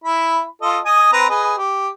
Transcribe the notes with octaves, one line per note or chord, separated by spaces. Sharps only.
E4 B5
F4 A4 D#5
D#5 G#5 D#6
C4 B4 A#5
G#4 B4 D#5
G4